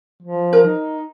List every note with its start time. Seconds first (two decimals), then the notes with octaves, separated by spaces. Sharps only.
0.22 F3
0.53 A#4 A#5
0.66 D#4